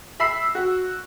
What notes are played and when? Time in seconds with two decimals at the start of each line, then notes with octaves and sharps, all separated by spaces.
0.20 E5 B5 E6 C7
0.55 F#4